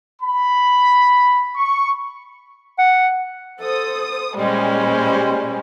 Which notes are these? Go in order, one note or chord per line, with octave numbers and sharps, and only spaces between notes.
B5
C#6
F#5
A4 C5 D#6
A#2 G3 G#3 C#4 C5